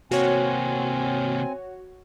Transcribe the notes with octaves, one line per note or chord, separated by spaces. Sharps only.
C3 A#3 C4 F#4 C#5 G#5